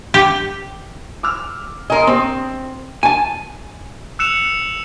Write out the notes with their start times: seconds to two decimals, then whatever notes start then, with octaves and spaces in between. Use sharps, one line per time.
0.14 G4
1.23 D6 E6 F6
1.90 A#4 D#5 G#5 A#5 C6
2.07 C4 G4
3.03 G#5 A5
4.19 E6 F#6 C#7 E7 F7